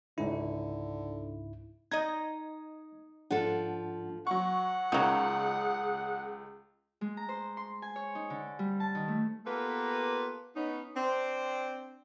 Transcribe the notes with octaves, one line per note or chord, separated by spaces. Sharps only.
C#2 G#2 D3 E4
D#4 D#5 G#6
G#2 F3 D4 A4 F#5
F#3 F#5 C#6
C#2 D#3 F#3 G#4
G#3
A#5
C5
C6
G#5
C#5
D#4
D3
G3
A5
D#3
A3
A#3 B3 F4 G4 A4 B4
B3 C#4 D#4
C4 D4